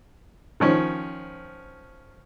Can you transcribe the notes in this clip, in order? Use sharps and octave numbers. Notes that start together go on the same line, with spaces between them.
D#3 F3 C#4